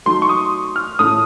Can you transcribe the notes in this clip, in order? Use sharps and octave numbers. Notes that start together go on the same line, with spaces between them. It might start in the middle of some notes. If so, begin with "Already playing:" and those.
F#3 A3 D#4 C6
C#6
D#6
F6
A2 A3 C#4 F4 D#6